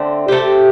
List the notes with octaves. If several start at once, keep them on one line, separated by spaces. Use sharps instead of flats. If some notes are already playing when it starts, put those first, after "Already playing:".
Already playing: D3 A3 C4
A3 C4 G4